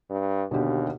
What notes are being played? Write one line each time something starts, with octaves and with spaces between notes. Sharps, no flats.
G2
D#2 B2 D3 G4